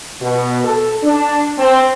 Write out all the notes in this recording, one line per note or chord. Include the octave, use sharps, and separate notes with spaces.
B2
A4
D4
C4